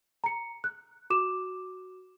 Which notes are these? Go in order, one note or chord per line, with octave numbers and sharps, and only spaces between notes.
A#5 C#7
F#6
F#4 D6 E7